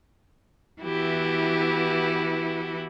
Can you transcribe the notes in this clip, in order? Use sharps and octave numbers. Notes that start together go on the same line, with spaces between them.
E3 B3 E4 F#4 G4